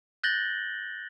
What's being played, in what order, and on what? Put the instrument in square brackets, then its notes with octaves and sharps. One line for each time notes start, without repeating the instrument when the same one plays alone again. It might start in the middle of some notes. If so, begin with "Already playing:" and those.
[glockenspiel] F#6 G6 A6 A#6 F#7 G7